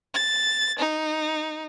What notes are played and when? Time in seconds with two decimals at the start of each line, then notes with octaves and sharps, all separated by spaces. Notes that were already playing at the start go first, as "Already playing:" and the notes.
0.14 A6
0.79 D#4